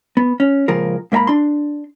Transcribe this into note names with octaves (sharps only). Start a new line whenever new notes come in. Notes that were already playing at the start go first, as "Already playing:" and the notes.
B3
C#4
C#2 A#2 F3 G#4 A#4
G#2 A#3 E5 A#5 B5
D4 C6